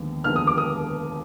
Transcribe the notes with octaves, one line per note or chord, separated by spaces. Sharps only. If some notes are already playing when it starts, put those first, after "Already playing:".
Already playing: D#2 D3 F3 G#3 B3
D#2 D3 F3 G#3 B3 F6
D#6
D6
D#6